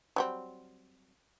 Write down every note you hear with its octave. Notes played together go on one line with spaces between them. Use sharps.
F#3 G3 C4